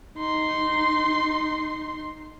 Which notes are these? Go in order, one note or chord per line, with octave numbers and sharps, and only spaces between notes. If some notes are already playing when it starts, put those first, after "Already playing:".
D#4 C6